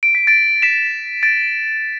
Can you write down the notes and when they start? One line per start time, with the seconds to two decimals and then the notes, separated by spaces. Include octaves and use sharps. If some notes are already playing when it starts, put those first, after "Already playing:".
0.03 D7
0.15 B6
0.27 A6 D7
0.62 B6 E7
1.23 A6 D7